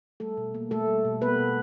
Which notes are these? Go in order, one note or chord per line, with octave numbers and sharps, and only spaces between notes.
G3 A3 A4
B2
A#3
B2 A3 A4
G3
B2
A#3 B3 B4
B2